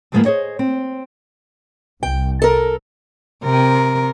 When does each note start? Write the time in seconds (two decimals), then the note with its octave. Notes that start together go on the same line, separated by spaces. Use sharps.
0.12 D#2 G#2 F3 G#3 A#3 B3
0.25 G#4 C5 C#5 D#5
0.59 C4
2.03 C2 G5
2.42 A4 A#4
3.44 C3 A#4